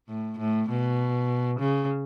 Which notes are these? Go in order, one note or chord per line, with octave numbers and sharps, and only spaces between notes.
A2
A2
B2
C#3